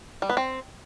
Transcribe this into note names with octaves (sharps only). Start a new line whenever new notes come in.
G3
B3
C4